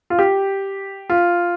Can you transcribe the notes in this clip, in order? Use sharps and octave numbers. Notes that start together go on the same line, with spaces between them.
F4
G4
F4